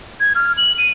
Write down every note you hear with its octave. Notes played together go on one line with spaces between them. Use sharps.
G#6
F6
F#7
D#7